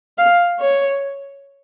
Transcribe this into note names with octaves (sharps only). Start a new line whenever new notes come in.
F5
C#5